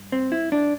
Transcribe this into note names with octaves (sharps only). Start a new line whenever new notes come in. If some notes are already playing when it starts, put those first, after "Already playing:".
Already playing: G2
C4
E4
D4